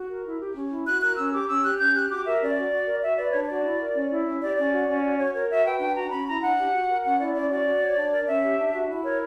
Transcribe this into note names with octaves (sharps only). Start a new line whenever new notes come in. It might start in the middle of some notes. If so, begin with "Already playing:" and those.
Already playing: F#4
A#4
E4
G4
C#4
E4
F#4 F#6
A#4 F#6
C#4 E6
G4 D6
C#4 E6
G4 F#6
C#4 G6
G4 F#6
F#4 D6
A#4 E5
C#4 D5
F#4
F#4
A#4
F#4 E5
B4 D5
D4 C#5
C#5
F#4 D5
E4
A#4
C#4
E4
C#4
G4 D5
C#4 D5
F#4
C#4
F#4
F#4 C#5
A#4 C#5
F#4 E5
B4 G5
D4 G5
F#4 A#5
C#4 B5
E4 A#5
D4 F#5
G4
F#4
A#4
C#4 F#5
E4 D5
C#4 D5
F#4 D5
F#4
C#5
D4
A#4
C#4 E5
G4
D4
F#4
E4
A#4 C#5